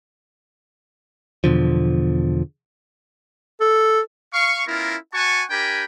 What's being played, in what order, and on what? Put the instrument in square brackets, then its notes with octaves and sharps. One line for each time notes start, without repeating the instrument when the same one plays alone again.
[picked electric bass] E2 B2 D3 F3
[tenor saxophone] A4
[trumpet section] F5 C#6
B3 C#4 E4 F4 A#4
F#4 F#5 G#5 A5 C#6
D4 G4 A#4 G5 G#5 B5